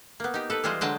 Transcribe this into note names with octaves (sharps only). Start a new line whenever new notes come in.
A#3 B3
D#4 G4
A4 B4
E3 G3 G#3 F4 C5 D#5
D3 F#3 G#3 D#5 G5 A5